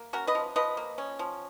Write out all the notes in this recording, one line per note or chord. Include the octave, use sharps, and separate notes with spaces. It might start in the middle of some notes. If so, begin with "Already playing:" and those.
Already playing: A#3
C#4 F#4 A#4
B4 D#5
F3
F3 B4 D#5
A#3
C#4
F3